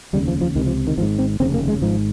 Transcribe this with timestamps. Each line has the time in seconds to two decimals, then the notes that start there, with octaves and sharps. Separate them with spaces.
0.13 F1 D#2 C#3 G3
0.27 F3
0.41 F3
0.55 C#2 C3 D#3
0.66 F3
0.87 D#3
0.97 G#1 F3
1.02 G#2
1.19 C4
1.40 F1 D#2 C#3 C4
1.54 A#3
1.68 G#3
1.82 G#1 G#2 F3